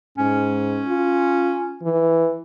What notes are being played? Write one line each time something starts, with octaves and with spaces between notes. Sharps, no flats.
G#2 C#4
F4
E3